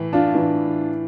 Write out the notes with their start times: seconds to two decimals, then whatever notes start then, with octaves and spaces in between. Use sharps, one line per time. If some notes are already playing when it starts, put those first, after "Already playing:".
Already playing: A2 E3
0.13 D4 F4
0.35 A2 E3